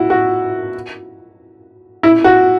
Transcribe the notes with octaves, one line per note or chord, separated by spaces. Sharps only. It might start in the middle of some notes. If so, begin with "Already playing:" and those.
Already playing: E4 F#4
F#4
E4
F#4